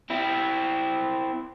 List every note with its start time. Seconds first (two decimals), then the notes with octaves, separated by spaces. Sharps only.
0.10 C4 E4